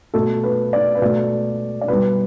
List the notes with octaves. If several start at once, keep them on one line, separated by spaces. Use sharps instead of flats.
B2 A3 A4
B4
D5
B4
B2 A3 D5
D5
B2 G3 B4